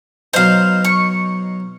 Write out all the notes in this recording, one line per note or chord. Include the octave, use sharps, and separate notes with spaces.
B2 F#3 D#4 C5 F5
C#6